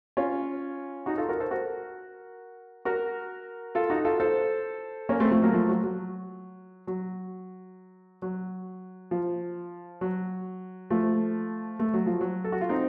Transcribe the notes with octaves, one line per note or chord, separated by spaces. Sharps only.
C#4 F4
D#4 F#4
F4 A4
F#4 A#4
A4 C5
F#4 A#4
F#4 A#4
F4 A4
D#4 F#4
F4 A4
A4 C5
A#3 C#4
A3 C4
F3 A3
F#3 A#3
F3 A3
F#3
F#3
F#3
F#3
F3
F#3
F3 A3
A3
F#3
F3
F#3
A4
F#4
F4
C4 D#4